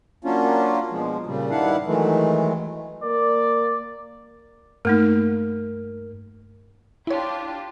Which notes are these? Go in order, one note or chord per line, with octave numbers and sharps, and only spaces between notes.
F#3 A#3 C#4 D4 F4
B2 F3 G#3
A#2 C#3 G3
G2 D#3 D4 E4 F5 F#5
D#3 E3 F#3 G#3 A3
A#3 D5
G2 A3 A#3 D#4 A#4 F6
D4 E4 F4 G4 C#5